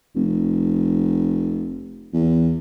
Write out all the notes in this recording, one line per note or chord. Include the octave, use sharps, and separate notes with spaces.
F1
E2